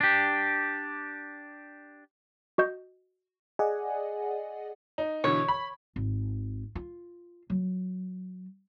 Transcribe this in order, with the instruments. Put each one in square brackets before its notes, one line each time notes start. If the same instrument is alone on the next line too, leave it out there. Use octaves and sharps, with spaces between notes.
[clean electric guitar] D4 G4
[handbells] F#4 D#5 G6
[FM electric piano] G#4 D5 D#5 F#5 G#5
[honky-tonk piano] D#4
[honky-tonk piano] B2 D3 E3 [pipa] C#5
[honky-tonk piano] B5
[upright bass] G#1
F4
F#3